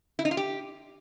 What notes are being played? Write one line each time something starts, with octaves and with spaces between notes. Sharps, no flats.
E4
D#4
F4
G4